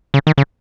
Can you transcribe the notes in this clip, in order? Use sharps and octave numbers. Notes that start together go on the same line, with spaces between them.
C#3
D#3
C#3